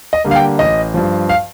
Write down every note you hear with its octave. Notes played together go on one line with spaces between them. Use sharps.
D#5
D3 G3 A#3
F5
G5
A1 D#5
G2 F3
F5